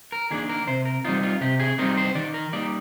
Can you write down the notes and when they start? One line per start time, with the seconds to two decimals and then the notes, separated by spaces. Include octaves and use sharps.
0.12 A#4
0.31 D#3 A#3 D4 G#4
0.49 A#4
0.67 C3 C5
0.85 A#4
1.04 G3 C4 D#4 F4
1.23 F4
1.41 C3 G4
1.60 G#4
1.78 G3 C4 D#4 A#4
1.97 C5
2.15 D#3 D5
2.34 A#4
2.53 G3 A#3 D#4 D5